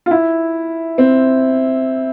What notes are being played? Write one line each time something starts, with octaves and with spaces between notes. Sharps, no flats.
F4
E4
C4